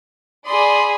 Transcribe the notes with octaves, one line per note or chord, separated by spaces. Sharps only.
G#4 D5 B5 C6 D#6